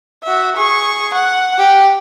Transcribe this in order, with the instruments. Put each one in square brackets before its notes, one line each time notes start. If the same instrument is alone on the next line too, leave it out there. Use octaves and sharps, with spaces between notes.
[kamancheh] F#4 E5
G#4 C#6
F#5
G4